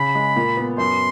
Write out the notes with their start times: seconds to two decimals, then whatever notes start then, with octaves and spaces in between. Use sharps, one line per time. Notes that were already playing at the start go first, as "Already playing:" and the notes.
Already playing: C#3 B5
0.15 G#3
0.36 A#2
0.57 B3
0.78 F#2 C6